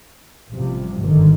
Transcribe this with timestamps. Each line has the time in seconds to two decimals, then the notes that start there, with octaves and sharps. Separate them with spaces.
0.51 A1 C3 F3 G3
0.99 G#1 G2 D3 D#3